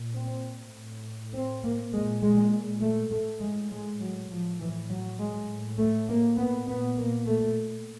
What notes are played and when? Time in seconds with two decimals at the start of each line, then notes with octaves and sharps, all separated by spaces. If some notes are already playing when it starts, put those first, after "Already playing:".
Already playing: A#2
0.15 C4
0.74 A2
1.33 C4
1.63 A#3
1.93 A#2 G#3
2.23 G#3
2.82 A3
3.12 A2 A3
3.41 G#3
3.72 G#3
4.01 F#3
4.31 A2 F3
4.60 E3
4.90 F#3
5.19 G#3
5.49 A2
5.79 A3
6.08 A#3
6.38 B3
6.67 A#2 B3
6.97 A#3
7.27 A3